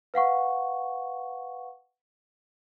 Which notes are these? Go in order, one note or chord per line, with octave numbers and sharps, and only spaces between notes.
B4 F5 F#5 C#6